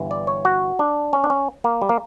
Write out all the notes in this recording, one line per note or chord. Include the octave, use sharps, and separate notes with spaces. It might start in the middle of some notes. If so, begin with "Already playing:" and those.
Already playing: G1 G2 E3
D5
C#5
F#4
D4
C#4
D4
C#4
A#3
G3
A#3